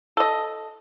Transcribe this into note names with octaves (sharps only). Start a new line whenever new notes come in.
A4 D#5